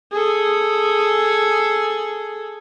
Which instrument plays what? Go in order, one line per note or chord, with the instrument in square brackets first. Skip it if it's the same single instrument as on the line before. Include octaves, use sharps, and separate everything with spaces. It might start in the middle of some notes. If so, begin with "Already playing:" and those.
[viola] G#4 A4